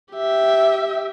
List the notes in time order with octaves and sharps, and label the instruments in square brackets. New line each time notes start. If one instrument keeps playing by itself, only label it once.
[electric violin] G4 E5